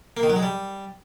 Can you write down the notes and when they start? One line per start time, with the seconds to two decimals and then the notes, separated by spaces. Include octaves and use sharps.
0.17 A#3
0.23 D#3
0.30 F#3
0.36 G#3
0.43 G3